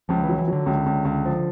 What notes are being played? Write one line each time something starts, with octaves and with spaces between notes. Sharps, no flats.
C#2 F3
E3
F#3
E3
F#3
D3
C#2
C#2
C#2
F3